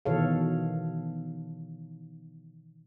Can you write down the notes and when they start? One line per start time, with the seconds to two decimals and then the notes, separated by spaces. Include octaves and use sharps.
0.05 B2 D#3 E3 A4 C#5 F5